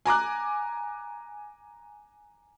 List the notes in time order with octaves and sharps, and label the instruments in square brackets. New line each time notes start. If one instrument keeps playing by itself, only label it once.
[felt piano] G#5 A#5 D6 F#6